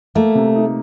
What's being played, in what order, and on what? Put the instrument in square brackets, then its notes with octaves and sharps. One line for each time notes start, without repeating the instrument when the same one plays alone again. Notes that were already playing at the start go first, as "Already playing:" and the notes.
[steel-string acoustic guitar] A3 [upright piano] A#3
[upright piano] C3
D#4